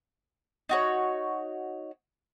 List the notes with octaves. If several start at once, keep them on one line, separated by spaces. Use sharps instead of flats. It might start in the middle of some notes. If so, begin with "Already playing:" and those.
D#4 F#4 C#5